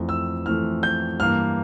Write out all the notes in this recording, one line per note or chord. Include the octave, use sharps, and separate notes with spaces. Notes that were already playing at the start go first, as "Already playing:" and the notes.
Already playing: F2 E3 A3
E6
F2 E3 A3 F6
G6
G2 E3 A#3 F6